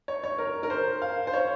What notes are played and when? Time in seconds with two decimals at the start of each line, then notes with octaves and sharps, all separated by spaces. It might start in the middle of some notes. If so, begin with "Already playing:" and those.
0.08 C#5
0.24 C#5
0.38 A#4
0.63 A#4
0.70 C5
1.02 F5
1.27 C5
1.33 C#5